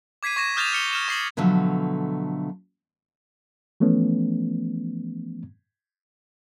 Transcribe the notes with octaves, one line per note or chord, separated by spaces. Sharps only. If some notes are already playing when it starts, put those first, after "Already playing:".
D6 G#6 B6 C7 D#7
C#6 G#6 A#6 E7
D#6 F6 G6 A6 E7 F7
F6 C#7 G7
F6 E7 G7
C#6 C7 F#7
B2 D3 F3 F#3 A3
E3 F3 A3 B3 C#4